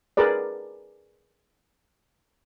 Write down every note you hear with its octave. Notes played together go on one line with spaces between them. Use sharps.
G#4 A#4 B4 D5